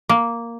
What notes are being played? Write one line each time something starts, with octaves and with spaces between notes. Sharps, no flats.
A#3